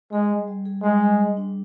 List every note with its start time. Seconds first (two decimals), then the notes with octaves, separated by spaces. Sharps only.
0.13 G#3 G#4
0.30 G3
0.48 G3
0.66 G#4
0.83 G3 G#3
1.01 G3
1.19 G3
1.37 D4